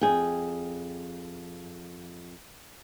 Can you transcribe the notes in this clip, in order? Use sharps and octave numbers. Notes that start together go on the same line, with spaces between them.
F2 G#4 G5